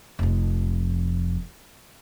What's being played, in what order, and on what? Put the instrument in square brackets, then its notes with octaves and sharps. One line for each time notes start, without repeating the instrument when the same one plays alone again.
[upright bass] F1 F2